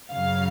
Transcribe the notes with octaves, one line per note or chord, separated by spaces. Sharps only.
F#2 C#3 F#3 F5